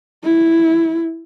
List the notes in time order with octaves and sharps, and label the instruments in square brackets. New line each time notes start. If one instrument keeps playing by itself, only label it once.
[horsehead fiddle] E4